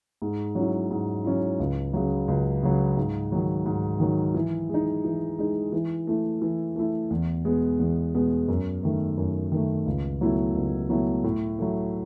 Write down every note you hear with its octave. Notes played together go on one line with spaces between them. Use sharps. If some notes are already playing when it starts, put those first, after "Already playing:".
G#2
F#3 C#4 E4
G#2
F#3 C#4 E4
C#2
C#3 F#3
C#2
C#3 F#3
G#2
D#3 F#3
G#2
D#3 F#3
E3
G#3 D#4
E3
G#3 D#4
E3
A3 E4
E3
A3 E4
E2
B2 G#3 B3
E2
B2 G#3 B3
F#2
D#3 A3
F#2
D#3 A3
C#2
B2 F#3 A3 E4
C#2
B2 F#3 A3 E4
A2
F#3 A3